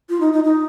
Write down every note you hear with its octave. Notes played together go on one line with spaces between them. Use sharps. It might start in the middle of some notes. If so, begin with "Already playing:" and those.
F4
D#4
D#4
D#4